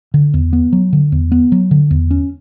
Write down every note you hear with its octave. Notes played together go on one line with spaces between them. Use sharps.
D3
E2
B3
F#3
D3
E2
B3
F#3
D3
E2
C#4